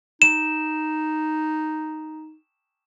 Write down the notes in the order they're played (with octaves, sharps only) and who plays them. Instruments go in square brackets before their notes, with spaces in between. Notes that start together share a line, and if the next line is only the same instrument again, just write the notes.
[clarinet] D#4 [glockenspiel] E7